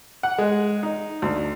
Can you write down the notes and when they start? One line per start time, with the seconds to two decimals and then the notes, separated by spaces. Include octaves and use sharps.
0.23 F#5
0.38 G#3
0.83 D#4
1.22 D2